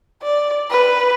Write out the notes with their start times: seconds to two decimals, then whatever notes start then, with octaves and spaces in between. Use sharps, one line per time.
0.23 D5
0.70 B4